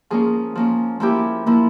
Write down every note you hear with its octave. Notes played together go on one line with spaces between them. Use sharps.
F3 A#3 C#4 G#4
F3 A#3 C#4
F3 A#3 E4 G4
F3 A#3 E4